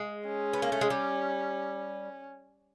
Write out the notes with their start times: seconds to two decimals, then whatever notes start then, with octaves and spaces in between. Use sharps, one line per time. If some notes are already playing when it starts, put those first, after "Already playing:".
Already playing: G#3
0.26 C#4
0.53 B3
0.62 A#3
0.72 A3
0.81 G#3
0.90 G3